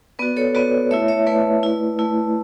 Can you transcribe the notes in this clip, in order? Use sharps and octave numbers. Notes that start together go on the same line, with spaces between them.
B3 F#4 B4 D5
A4 C#5
B3 F#4 B4 D5
A3 E4 C#5 E5
C#5 E5
A3 E4 B4 D5
A3 E4
A3 E4